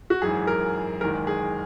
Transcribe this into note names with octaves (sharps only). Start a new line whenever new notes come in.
F#4
G#1 F#2 E3 G#4
A#4
F#1 E2 D#3 G#3 A#4
G#4